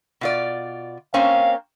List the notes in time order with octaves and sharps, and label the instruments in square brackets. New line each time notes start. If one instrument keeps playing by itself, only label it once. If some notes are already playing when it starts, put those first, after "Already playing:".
[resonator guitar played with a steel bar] B2 F4 D5
[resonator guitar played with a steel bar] A#3 C4 C#4 [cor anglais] F5